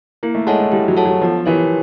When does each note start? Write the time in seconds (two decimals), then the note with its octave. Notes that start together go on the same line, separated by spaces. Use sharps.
0.23 A#3 E4
0.35 A3
0.47 G#3 A4 C#5 F#5 A5
0.59 A3
0.72 G3 E4
0.88 F#3
0.97 A4 C#5 F#5 A5
1.05 F#3
1.21 F3 B3
1.46 E3 E4 G4 A#4 C#5